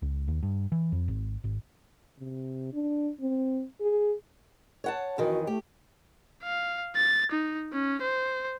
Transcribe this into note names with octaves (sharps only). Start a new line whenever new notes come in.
C#2
D#2
G2
E3
F2
G#1
G#1
C3
D4
C4
G#4
C#5 F#5 A5
F2 D#3 E3 F#4
A3 G4
F5
A6
D#4
C#4
C5